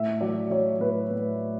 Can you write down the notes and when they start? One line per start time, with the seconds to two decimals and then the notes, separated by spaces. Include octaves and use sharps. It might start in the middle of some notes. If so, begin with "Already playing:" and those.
Already playing: A2 E5
0.21 F#3 D5
0.50 F#3 C#5
0.80 A2 B4
1.10 A2